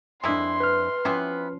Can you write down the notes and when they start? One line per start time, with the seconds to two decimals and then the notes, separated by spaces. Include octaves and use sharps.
0.24 F2 G#3 A#3 D4 E4 C6
0.60 B4 F6
1.05 C3 E3 F3 B3 C#4